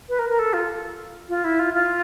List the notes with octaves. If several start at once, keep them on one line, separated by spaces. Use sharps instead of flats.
B4
A#4
A#4
A4
F4
F4
E4
F4
F4